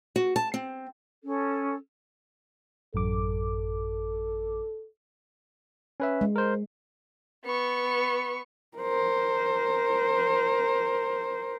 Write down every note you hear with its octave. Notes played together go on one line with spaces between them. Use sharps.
F#4
A5
C4
C#4 A4
A1 F#2 A4 D6
C#4 B4 E5
G#3
A#4 C5
B3 C#6
A#4 C5